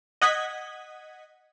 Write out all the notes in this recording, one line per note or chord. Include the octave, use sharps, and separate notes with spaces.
D#5 F#5 G#6 B6